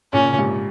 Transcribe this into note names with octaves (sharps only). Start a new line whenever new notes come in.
A#2 C#3 C#4
A#2
G#2 C3